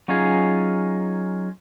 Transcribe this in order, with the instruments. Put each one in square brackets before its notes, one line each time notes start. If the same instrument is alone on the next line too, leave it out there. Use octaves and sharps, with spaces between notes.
[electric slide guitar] F#3 C#4 D#4 F4 G#4